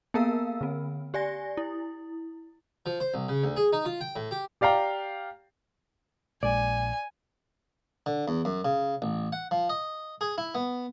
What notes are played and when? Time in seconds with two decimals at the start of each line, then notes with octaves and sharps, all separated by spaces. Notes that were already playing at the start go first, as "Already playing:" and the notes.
0.14 A#3 B3 A#4 F5 E6
0.61 D3 C4
1.14 G4 D5 G#5 A#6
1.57 E4
2.86 F3
3.00 C5
3.14 C2
3.28 C#3
3.44 D2
3.56 G#4
3.73 D#4
3.85 F4
4.01 G5
4.16 A2
4.31 G4
4.61 G4 D5 F5 G5 A#5
6.43 A#1 G#3 D5 G#5
8.06 D3
8.28 E2
8.45 F#2
8.65 C#3
9.02 A1
9.33 F#5
9.51 F3
9.69 D#5
10.21 G#4
10.38 E4
10.55 B3